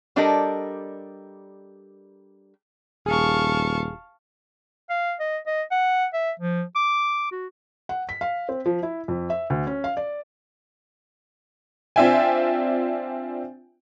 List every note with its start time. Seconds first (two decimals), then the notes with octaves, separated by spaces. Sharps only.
0.16 G3 D4 G4 A4 A#4 D#5
3.06 D#1 G#4 F5 A5 C#6
4.90 F5
5.20 D#5
5.47 D#5
5.71 F#5
6.14 E5
6.40 F3
6.76 D6
7.32 F#4
7.89 F#5
8.09 B6
8.21 F5
8.49 C4
8.66 F3
8.83 E4
9.08 F2
9.30 E5
9.50 D2
9.67 C#4
9.84 F5
9.97 D5
11.96 C4 D4 F4 E5 G5 G#5